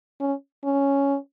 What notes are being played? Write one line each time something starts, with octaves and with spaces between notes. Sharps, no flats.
C#4
C#4